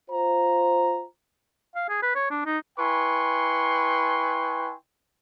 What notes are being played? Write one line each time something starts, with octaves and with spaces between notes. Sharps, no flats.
F4 C5 A#5
F5
G#4
B4
C#5
D4
D#4
E4 B4 G5 G#5 C6 C#6